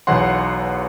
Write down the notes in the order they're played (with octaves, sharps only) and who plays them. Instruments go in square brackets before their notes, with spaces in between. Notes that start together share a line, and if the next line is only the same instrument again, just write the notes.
[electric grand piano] B1 E2 C#5 F#5 C6